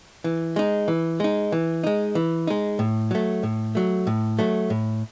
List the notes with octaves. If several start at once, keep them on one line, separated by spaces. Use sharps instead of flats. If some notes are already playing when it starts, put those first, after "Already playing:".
E3
G#3 D#4
E3
G#3 D#4
E3
G#3 D#4
E3
G#3 D#4
A2
F#3 A3
A2
F#3 A3
A2
F#3 A3
A2